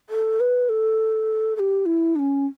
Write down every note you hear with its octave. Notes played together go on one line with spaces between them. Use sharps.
A4
B4
A4
A4
G4
E4
D4
C#4